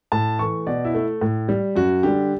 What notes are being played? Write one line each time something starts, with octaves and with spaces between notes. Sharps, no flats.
A2 A5
E3 A3 C#6
B2 D5
E4
A3
A2
G3
F#2 F#4
D3 G3 G4